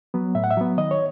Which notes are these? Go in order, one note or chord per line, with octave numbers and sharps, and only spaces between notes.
F#3 B3
A2 E5
F#5
E5
F#3 B3
D#3 D#5
C#5